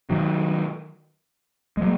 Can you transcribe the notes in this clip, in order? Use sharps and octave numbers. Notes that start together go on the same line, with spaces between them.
D#3 F#3
G#3
F#3 A#3